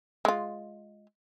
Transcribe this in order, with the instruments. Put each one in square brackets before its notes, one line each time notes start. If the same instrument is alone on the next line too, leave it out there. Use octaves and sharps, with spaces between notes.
[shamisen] G#3 F4